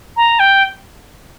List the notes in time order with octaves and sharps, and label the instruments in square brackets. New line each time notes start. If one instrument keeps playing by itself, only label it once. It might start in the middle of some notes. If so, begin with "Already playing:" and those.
[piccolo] A#5
G5